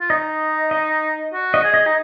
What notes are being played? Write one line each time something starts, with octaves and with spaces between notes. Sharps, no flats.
F4
D#4 D#5
D#5
F#4
D#5
G#4
D#5
D#4